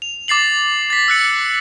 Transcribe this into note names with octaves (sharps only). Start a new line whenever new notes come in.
F7
D6 A6 C7 F#7
A6 B6
E6 F#6 C#7